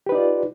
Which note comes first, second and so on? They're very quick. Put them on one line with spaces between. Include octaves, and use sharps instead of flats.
G4 B4 D#4 D5 F4